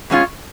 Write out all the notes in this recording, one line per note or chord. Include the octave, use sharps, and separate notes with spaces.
B2 G#3 C#4 F4